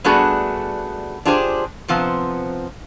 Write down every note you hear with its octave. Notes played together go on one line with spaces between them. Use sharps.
G3 A3 B3 D4 F#4 G#4
D4 F4 G4 G#4 A#4 C5
C3 F3 B3 C4